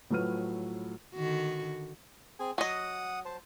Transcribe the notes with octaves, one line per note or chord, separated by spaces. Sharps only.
A2 F3 F#3 B4 F6 D#7
D3 D#3 F#4
C4 G#4 G#5
F#3 D#5 F#5 D#6
C5 A5